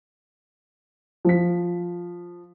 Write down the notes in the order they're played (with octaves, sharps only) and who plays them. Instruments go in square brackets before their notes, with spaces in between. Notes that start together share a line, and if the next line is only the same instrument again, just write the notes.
[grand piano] F3 B6